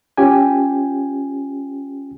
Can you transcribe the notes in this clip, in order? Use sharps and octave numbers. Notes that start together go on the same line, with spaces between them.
C#4 F4 G4 G5 G#5